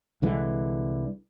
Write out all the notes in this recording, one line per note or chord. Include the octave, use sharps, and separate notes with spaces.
C2 D3 E3 G#3